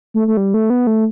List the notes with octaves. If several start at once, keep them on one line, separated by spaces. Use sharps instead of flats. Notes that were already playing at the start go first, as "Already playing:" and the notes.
A3
A3
G3
A3
B3
A3